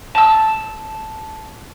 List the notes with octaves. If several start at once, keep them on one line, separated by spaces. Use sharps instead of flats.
A5 E6